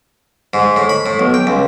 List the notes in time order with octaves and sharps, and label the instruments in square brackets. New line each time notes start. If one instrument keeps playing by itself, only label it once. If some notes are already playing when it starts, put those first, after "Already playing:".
[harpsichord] G#2
A2
B5
A2
B1
G5
C#2